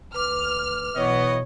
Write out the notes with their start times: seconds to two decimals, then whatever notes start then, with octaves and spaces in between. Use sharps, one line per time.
0.14 D2 B4 D6 F6
0.96 B1 E3 B3 C#5 D#5